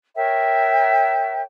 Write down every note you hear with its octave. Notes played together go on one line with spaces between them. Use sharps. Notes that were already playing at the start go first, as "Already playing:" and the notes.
A#4 C#5 E5 G5